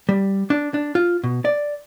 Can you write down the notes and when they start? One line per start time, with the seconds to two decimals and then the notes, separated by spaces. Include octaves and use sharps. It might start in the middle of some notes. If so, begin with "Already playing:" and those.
0.09 G3
0.50 D4
0.74 D4
0.95 F4
1.24 B2
1.45 D5